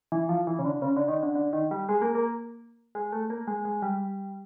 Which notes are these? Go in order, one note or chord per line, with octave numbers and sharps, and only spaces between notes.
E3
F3
E3
C#3
D3
C#3
D3
D#3
D3
D3
D#3
G3
G#3
A#3
A#3
G#3
A3
A#3
G#3
G#3
G3